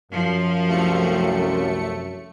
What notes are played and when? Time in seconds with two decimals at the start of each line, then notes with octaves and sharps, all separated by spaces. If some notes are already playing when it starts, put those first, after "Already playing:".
0.12 F#2 F3
0.68 C2 A3 C#7